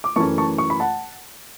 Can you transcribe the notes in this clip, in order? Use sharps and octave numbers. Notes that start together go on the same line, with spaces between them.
D6
F#2 E3 A3 C#4 A5 C#6
A5 C#6
C#6
B5
F#5 A5